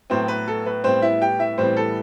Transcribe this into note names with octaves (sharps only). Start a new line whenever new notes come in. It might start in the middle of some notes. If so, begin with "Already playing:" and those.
A2 F#3 B3 C4 C5
B4
A4
B4
A2 G3 B3 C4 C5
E4 E5
G4 G5
E4 E5
A2 E3 G3 B3 C4 C5
A4